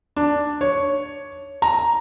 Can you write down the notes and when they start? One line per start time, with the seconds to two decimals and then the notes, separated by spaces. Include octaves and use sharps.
0.16 D4
0.61 C#5
1.62 A#5